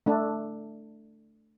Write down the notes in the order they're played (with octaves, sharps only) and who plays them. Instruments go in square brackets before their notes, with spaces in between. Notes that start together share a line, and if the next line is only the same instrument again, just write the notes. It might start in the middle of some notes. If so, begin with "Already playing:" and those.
[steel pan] A3 D4